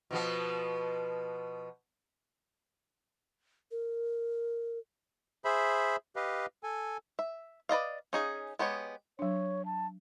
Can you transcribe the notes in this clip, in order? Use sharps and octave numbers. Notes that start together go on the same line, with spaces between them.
B2 F3 B3
A#4
G#4 C5 E5 B5
G4 B4 D#5 F5
A4 G#5
E5
B4 D5 D#5 F5
C#4 D#4 G#4 F5
G#3 B3 G4 C#5
F#3 D4 C#5
A5